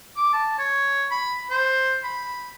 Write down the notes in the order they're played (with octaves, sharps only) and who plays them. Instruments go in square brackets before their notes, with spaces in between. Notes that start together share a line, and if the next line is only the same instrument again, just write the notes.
[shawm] D6
A5
C#5
B5
C5
B5